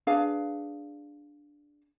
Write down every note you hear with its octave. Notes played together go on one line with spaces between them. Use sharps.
D4 G#4 B4 F5